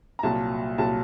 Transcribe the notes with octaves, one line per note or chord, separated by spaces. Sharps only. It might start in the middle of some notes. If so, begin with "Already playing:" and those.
A#5
C2 A#2 F#3 A5
C2 A#2 F#3 A5